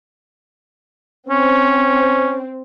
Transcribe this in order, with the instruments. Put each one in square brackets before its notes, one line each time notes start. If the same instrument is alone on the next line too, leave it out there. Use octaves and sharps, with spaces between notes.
[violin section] C4 [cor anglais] C#4